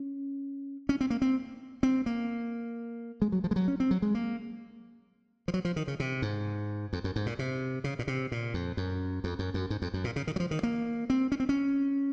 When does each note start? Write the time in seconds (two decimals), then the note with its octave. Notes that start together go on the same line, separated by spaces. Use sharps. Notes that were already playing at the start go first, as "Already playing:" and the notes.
Already playing: C#4
0.89 C#4
1.01 C4
1.10 A#3
1.22 C4
1.83 C4
2.06 A#3
3.22 G#3
3.32 F#3
3.44 F3
3.51 G#3
3.56 F#3
3.68 C#4
3.80 C4
3.91 F#3
4.02 G#3
4.15 A#3
5.48 F3
5.54 F#3
5.65 F3
5.76 D#3
5.88 C#3
6.00 C3
6.22 G#2
6.93 F2
7.04 F#2
7.16 G#2
7.26 A#2
7.39 C3
7.84 C#3
7.99 A#2
8.07 C3
8.32 A#2
8.54 F2
8.77 F#2
9.24 F2
9.39 F#2
9.54 F#2
9.70 G#2
9.82 F2
9.94 F#2
10.04 A#2
10.16 C#3
10.27 D#3
10.36 F#3
10.40 F3
10.51 D#3
10.63 A#3
11.10 C4
11.32 C#4
11.40 C4
11.49 C#4